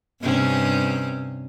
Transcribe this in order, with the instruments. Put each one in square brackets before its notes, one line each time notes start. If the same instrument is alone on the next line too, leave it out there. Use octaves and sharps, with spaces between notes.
[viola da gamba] G2 C3 C#4